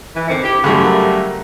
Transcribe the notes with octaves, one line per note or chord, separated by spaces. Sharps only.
E3
D3 D#3 C4 C7 C#7
E4 G4
F#2 C#3 G3 A3 B5 C6
A#4 F#5 A#5